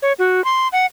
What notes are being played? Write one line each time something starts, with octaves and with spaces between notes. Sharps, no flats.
C#5
F#4
C6
F#5